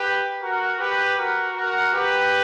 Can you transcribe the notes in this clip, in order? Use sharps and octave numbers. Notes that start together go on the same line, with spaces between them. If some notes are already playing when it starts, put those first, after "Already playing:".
Already playing: G4 B4
F#4 A#4
G4 B4
F#4 A#4
F#4 A#4
G4 B4